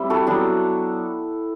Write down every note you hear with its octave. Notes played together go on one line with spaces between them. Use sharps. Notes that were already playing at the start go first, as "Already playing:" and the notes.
Already playing: G3 C4 E4
F#4 A4
F#3 B3 D4